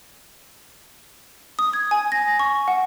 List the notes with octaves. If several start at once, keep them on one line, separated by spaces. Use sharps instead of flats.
D#6
G#6
G#5
A#6
C#6
F#5